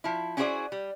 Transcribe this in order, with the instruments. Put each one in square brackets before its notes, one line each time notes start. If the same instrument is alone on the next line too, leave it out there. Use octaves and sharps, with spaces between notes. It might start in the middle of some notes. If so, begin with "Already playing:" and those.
[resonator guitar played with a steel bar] F3 E4
C#4 E4 F#4 G#4 C5 D5
G3